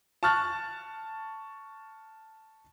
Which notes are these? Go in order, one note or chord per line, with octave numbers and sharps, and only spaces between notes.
A5 C#6 F6 F#6 A6